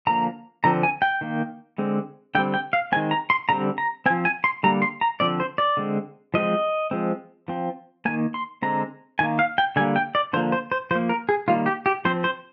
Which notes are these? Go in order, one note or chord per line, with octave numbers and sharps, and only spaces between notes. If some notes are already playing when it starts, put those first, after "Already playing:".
D3 F3 A#3 A#5
D3 F3 C4 A#5
G#5
G5
D#3 A#3
D3 G#3 C4
D3 G3 C4 G5
G5
F5
D#3 G#3 C4 G#5
A#5
C6
D3 G3 C4 A#5
A#5
F3 C4 G#5
G#5
C6
D3 G3 A#3 A#5
C6
A#5
D3 F3 C4 D5
C5
D5
D3 G#3 C4
F3 G#3 C4 D#5
F3 G#3 C4
F3 C4
D#3 A#3 G#5
C6
D3 G#3 C4 A#5
D#3 A#3 G#5
F5
G5
D3 G3 A#3 G#5
G5
D5
D3 F3 A#3 C5
C5
C5
F3 A#3 C5
A#4
G#4
D#3 G3 A#3 F4
G4
G4
F3 C4 C5
C5